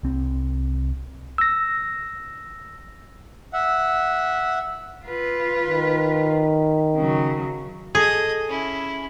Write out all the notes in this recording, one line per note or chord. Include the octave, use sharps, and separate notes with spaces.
C2 C4
E6 A#6
E5 F#5
F4 B4
D#3
C#3 F#3
G#4 A4 D#5 D#6
C#4 E4